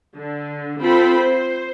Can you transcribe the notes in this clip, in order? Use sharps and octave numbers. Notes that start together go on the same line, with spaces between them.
D3
C4 F4 A4 B5
C5